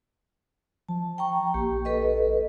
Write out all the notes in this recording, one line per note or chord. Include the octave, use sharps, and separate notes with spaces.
F3 A5
G5 A#5 C#6
A#1 A#3 G4
A4 B4 D#5